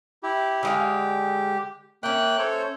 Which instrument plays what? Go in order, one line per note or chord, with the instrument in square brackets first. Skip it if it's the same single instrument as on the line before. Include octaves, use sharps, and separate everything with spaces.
[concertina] E4 G4
[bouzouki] D3 G#3 F5 [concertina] G4
[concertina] A#3 G5 F#6 [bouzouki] C#4 E5
[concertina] A4 C5 C#5